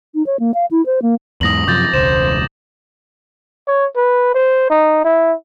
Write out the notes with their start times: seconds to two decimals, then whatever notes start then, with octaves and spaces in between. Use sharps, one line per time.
0.15 D#4
0.26 C#5
0.40 A#3
0.54 F5
0.71 E4
0.86 C5
1.02 A#3
1.41 E2 G#2 D#6 A#6 F#7
1.67 F#2 C3 F3 D6 G6 A6
1.94 E1 C#2 C5 E7
3.67 C#5
3.96 B4
4.35 C5
4.70 D#4
5.05 E4